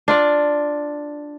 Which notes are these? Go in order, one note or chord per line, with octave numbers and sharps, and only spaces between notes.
D4 F4 D5